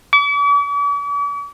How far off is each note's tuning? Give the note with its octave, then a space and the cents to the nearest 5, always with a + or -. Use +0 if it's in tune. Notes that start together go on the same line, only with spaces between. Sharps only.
D6 -45